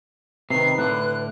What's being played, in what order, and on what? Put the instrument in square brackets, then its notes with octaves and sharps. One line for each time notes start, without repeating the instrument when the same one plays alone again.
[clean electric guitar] C3 D#3 [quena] B4 [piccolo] C7
[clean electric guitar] A2 D3 [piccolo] F#6